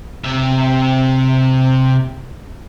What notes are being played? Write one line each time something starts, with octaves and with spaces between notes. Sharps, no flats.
C3 E5